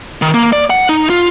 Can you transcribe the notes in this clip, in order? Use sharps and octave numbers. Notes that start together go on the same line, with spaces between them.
D#3
A#3
D5
F#5
D#4
F4